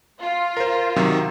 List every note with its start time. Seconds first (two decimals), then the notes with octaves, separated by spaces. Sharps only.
0.20 F4
0.57 A#4 C5
0.96 C3 D#3 F#3